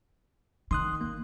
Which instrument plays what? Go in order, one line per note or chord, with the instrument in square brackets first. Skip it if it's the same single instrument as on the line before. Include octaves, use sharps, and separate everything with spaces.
[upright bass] D#3 [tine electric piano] C6 D#6 F#6
[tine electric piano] A#3